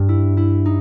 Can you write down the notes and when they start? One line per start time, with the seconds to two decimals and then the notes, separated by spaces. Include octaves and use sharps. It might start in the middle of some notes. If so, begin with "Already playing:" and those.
Already playing: G2
0.09 E4
0.37 E4
0.66 D#4